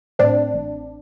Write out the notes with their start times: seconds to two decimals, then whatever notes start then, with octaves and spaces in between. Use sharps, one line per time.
0.19 A2 C4 D4
0.54 A1